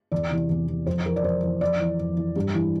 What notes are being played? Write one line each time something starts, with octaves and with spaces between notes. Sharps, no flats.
E2 D5
C3 E3
E2
C3 E3
F2 C5
E3 A#4
D5
F2 C5
E3
F2 D5
E3
F2
E3
G2
E3